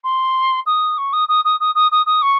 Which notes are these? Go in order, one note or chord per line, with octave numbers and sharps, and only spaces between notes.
C6
D#6
C#6
D#6
D#6
D#6
D#6
D#6
D#6
D#6
C#6